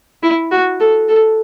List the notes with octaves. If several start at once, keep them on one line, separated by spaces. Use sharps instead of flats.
E4
F#4
A4
A4